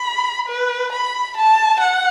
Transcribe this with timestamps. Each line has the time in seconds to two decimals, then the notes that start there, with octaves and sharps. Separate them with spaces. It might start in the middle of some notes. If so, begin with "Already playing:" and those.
Already playing: B5
0.48 B4
0.93 B5
1.37 A5
1.80 F#5